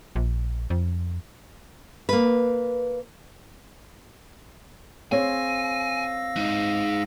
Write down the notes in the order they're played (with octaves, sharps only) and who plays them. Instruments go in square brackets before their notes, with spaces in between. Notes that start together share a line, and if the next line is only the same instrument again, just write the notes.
[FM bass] A#1
F2
[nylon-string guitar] A#3 B4
[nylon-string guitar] C4 G#4 C#5 [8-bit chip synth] F5 E6 A#6 [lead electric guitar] G#5
[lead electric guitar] G#3 D#4